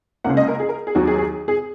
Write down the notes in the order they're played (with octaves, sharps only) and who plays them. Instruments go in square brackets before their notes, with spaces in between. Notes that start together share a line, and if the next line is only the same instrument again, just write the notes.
[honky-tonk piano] C#2 C#3 A#3 F#5
D#5
A#4
G#4
A#4
G#4
D#2 D#3 F#3 F#4
G#4
G#4
G#4